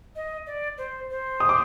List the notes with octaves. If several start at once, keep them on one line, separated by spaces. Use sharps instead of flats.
D#5
D5
C5
C5
D#6
D6